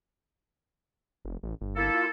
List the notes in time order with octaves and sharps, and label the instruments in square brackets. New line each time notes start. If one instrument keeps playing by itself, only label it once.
[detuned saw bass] F1
A1
G1
[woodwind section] A#3 E4 A4
[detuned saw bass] F4